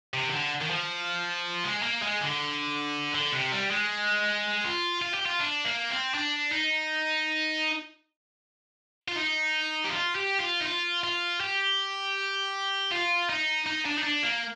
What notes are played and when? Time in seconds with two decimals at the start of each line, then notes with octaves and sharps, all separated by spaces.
0.14 C3
0.28 D#3
0.32 D3
0.61 D#3
0.70 F3
1.64 G#3
1.83 A#3
2.02 G#3
2.21 D3
3.15 D3
3.33 C3
3.53 G3
3.71 G#3
4.65 F4
5.02 F4
5.14 G4
5.26 F4
5.40 D4
5.65 A#3
5.90 C4
6.14 D4
6.52 D#4
9.08 F4
9.16 D#4
9.84 G4
9.90 F4
10.16 G4
10.41 F4
10.61 D#4
10.65 F4
11.04 F4
11.41 G4
12.91 F4
13.29 D#4
13.66 D#4
13.86 D4
13.98 D#4
14.04 D4
14.23 A#3